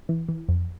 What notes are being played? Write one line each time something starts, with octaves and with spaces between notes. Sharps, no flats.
E3
E3
F2